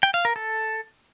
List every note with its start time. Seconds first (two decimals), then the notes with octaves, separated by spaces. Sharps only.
0.03 G5
0.14 F5
0.25 A#4
0.36 A4